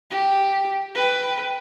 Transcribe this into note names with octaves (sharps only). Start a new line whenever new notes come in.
G4
B4 G5